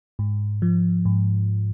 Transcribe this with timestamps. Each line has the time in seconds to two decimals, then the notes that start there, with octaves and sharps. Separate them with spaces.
0.19 G#2
0.62 F3
1.05 G#2